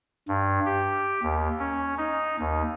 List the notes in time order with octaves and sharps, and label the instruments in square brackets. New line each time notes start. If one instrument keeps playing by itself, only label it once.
[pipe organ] G2
G4
D#2
C#4
D#4
D#2